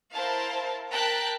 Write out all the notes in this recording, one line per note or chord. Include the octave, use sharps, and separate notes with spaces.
E4 A#4 C5 F5 A5
A#4 G5 A5 F#6 B6